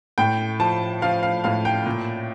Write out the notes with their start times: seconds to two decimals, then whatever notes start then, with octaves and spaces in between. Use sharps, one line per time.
0.18 A2 G5
0.60 F3 A5
1.02 F3 F5
1.23 F5
1.44 A2 F5
1.65 G5
1.86 A#2